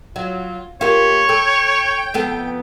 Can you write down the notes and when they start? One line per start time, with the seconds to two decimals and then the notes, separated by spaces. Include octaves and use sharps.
0.16 F#3 F4
0.81 A#3 F4 G4 C#5
1.29 A4 G5
2.14 F2 B3 A4